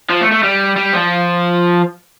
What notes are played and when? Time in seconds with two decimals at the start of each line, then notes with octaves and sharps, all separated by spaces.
0.10 F3
0.21 A3
0.32 A3
0.43 G3
0.76 G3
0.93 F3